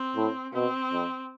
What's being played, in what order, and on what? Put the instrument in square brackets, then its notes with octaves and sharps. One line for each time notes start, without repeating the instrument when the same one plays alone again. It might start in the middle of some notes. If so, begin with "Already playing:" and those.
Already playing: [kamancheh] C4
[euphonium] A2
[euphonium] B2 [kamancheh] C4
[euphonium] F2